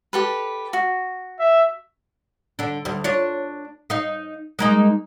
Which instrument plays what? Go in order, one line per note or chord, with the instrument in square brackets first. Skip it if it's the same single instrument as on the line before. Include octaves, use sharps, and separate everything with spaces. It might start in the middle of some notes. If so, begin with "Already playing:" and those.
[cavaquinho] G4 A4 B4
F#4
[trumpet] E5
[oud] D3 D4
D2 G3
D4 F4 C#5
D#4 F5
G#3 A#3 D#4